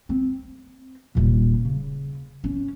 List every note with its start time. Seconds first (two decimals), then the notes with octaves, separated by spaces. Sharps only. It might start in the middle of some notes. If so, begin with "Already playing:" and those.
0.09 C4
1.15 D#1 A#2
1.65 C#3
2.44 C#4